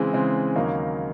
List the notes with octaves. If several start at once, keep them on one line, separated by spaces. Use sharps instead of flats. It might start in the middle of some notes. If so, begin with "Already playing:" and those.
Already playing: C#3 E3 G#3 C4
C#3 E3 G#3 C4
D#2 C#3 F#3 A#3 D#4